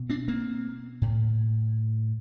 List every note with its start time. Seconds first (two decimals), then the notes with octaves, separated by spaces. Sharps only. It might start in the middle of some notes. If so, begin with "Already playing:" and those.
Already playing: B2
0.09 C4 D4
0.28 A#3 C4
1.02 A2